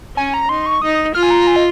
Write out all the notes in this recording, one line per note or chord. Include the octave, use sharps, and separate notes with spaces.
C#4 G#5
A#5
D#4 C6
C#6
D#4 D#6
F4 F6
G#5
A#5
G#5
D#5